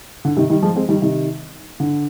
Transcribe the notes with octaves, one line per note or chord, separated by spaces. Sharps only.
D3
C3 D#3
D#3 G3
F3 G#3
G#3 C4
D#3 G3
C3 D#3
D3